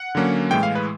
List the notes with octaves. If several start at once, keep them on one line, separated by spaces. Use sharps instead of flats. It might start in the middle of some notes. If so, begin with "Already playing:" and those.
Already playing: F#5
D3 F#3 A#3 C#4
A2 E3 G#3 G5
F5
B4